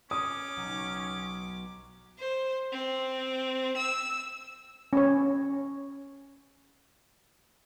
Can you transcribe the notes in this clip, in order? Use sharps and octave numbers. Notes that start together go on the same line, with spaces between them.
C#4 D6 D#6
B1
C5
C4
E6
C#4 C#5